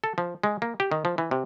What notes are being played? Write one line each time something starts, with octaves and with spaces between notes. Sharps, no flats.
A4
F3
G#3
A#3
G4
D#3
F3
E3
C3